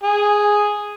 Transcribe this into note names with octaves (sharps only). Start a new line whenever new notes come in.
G#4